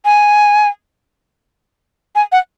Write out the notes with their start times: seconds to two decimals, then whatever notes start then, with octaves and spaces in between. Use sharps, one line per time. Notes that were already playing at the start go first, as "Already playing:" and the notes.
0.05 G#5
2.16 G#5
2.32 F#5